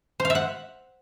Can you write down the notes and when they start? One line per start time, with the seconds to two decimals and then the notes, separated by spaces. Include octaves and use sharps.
0.20 C5
0.25 F5
0.30 E5
0.35 F#5